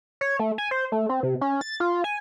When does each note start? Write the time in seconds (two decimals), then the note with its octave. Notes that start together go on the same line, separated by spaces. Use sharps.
0.21 C#5
0.39 A3
0.58 G#5
0.71 C5
0.92 A3
1.09 C4
1.23 C3
1.41 C#4
1.61 A6
1.80 F4
2.04 G#5